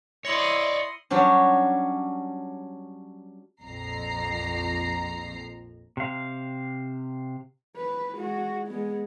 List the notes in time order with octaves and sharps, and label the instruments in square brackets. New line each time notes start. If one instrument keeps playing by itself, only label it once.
[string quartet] E4 C6 D#6 [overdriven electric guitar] C#5 D5 [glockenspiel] A#6 C#7 F#7
[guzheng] F#3 G3 C#4 D4
[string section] A#1 F2 F3 A#5 C7
[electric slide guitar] C3 F5
[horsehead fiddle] B4
G#3 F#4
G#3 B3